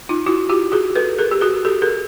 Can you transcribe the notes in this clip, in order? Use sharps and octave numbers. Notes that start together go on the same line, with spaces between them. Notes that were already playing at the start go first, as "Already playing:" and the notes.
D#4 F4
E4 F#4
F4 G4
F#4 G#4
A4 B4
G#4 A#4
G4
F#4 G#4
G4 A4
G#4 A#4